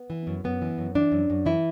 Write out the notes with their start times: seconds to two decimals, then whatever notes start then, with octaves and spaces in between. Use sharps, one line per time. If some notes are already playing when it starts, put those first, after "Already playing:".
Already playing: B3
0.10 E3
0.27 F#2
0.44 F#2 B3
0.62 E3
0.78 F#2
0.95 E3 D4
1.12 F#2
1.30 F#2
1.46 E3 E4